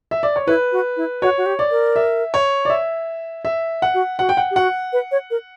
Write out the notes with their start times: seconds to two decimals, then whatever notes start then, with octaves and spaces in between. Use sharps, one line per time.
0.11 E5
0.23 D5
0.36 C#5
0.47 E4 B4
0.72 F#4
0.97 E4
1.22 F#4 C#5
1.38 F#4
1.46 G4
1.59 D5
1.71 A#4
1.96 E5
2.34 C#5
2.65 D5
2.70 E5
3.45 E5
3.82 F#5
3.94 F#4
4.19 F#4 F#5
4.29 G5
4.37 F#5
4.51 G4
4.56 F#4 F#5
4.93 B4
5.11 C#5
5.31 A#4